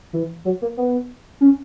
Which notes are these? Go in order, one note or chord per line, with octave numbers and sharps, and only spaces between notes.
E3
F#3
A#3
B3
C#4